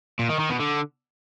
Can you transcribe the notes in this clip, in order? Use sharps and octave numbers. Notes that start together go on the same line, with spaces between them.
A#2
D#3
D#3
B2
D3